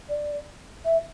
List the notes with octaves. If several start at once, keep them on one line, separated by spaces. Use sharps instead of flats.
D5
E5